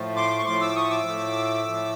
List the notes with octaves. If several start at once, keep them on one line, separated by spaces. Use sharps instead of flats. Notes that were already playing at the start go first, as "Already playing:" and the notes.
Already playing: A2 F3 A3
C6 D6
C#6
A2 F3 A3 C6 D6
D6 E6
C#6 D#6
D6 E6
A2 F3 A3
A2 F3 A3